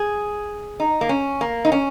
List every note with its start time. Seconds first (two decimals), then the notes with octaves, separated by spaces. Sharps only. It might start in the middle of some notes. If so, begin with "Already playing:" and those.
Already playing: G#4
0.80 D#4
1.01 A#3
1.09 C#4
1.41 A#3
1.65 D#4
1.72 C#4